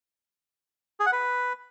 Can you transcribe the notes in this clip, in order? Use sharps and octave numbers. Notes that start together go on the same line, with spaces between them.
G#4
F#5
B4